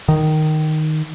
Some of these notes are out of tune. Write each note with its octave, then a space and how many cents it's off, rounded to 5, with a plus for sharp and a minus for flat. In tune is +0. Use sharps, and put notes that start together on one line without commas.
D#3 -5